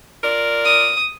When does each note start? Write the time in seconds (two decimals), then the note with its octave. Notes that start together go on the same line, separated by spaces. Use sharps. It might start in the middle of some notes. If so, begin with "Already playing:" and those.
0.23 F4 A#4 D5
0.65 D#6